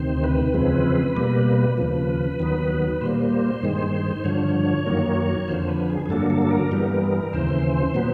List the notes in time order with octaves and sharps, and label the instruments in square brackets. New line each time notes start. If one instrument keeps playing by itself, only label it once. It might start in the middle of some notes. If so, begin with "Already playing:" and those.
Already playing: [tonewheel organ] D2 C3 D#3 C5
B4
E2 C#3 F3 G#3 C4
B2 G3 A#3
D#2 C#3 F3 B4
D#2 D#3 F#3 B3
A#2 G3 A#3 C5
G2 D#3 G#3
G2 D3 F3 C#5
F#2 D#3 F#3 A#3
F2 D3 F3 C5
B4
G#4
G#4
G2 D3 F#3 A#3 A4
A4
A4
A#4
G2 E3 G3 B3
D#2 C#3 E3 C5
A#2 F#3 B3